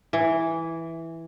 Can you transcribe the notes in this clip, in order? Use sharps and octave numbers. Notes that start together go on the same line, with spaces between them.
E3